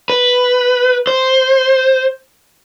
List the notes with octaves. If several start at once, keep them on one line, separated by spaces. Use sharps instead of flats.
B4
C5